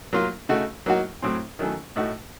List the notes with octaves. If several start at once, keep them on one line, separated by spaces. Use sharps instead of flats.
F#3 A#3 F4
C#3 A3 D#4 F#4
F#3 A#3 D#4 F#4
A2 F#3 C4
D#3 F#3 A3 C#4
A2 A3 D#4 F#4